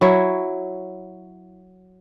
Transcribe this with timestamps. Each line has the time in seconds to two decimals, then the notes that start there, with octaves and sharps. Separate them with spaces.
0.01 F#3 E4 C#5